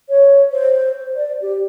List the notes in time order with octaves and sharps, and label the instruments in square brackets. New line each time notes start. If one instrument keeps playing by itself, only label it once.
[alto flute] C#5
C5
D5
G4